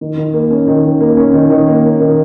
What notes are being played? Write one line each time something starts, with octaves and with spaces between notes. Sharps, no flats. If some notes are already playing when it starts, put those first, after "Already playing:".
D#3
D#3
A#3
C#4
D#3
D#3
A#3
C#4
D#3
D#3
A#3
C#4
D#3